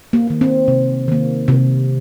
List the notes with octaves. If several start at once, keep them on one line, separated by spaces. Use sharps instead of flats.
A#3
D#3 A#3
C4
C3
D#3 A#3
C3